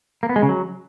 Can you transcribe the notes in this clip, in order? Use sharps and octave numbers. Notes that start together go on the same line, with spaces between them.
A#3
B3
G#3
C#3
F#3